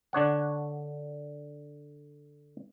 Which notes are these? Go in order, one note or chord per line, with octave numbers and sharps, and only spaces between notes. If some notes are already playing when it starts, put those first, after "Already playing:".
D3 D4 C#5 F#5